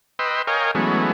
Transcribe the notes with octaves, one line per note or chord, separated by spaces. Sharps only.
B4 D#5 G5 C6 E6
A#4 C#5 D#5 F5 G5 G#5
E3 F#3 G#3 A3 B3 C#4